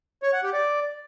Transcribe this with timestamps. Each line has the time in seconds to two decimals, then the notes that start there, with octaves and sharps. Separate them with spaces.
0.23 C#5
0.33 F#5
0.43 G4
0.53 D5